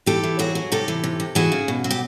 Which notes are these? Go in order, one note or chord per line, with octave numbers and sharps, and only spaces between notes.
E3 G4 A4
E3
F#3 F#4 G#4
F#3
C3 G4 A4
E3
C3
C3
E3 F#4 G#4
C#3
B2
F#3
G4